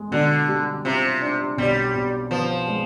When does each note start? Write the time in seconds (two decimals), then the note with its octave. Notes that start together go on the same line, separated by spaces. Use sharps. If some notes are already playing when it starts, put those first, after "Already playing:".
Already playing: G#3
0.11 B2 D3
0.48 G3
0.85 C3 F4
1.21 D4
1.58 B1 G3
1.94 B2
2.31 F3 B3
2.68 G#3